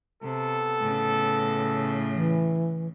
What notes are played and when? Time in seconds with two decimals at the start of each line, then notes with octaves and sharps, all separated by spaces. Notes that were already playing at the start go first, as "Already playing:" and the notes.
0.22 C3 B3 A4
0.80 A2 C#3
2.14 E3